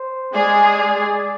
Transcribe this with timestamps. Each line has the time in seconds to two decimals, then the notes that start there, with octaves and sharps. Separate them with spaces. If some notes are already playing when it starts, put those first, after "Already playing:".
Already playing: C5
0.33 G#3 G#4 D5
0.79 D5